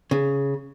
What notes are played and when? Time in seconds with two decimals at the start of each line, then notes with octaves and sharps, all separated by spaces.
0.11 C#3